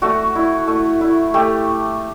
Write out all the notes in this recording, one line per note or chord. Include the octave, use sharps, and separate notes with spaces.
A3 F#4
E4
A3
E4
A3 G4